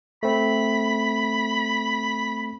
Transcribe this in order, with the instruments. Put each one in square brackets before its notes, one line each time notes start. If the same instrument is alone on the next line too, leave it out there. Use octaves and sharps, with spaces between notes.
[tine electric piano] A3 C4 [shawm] B5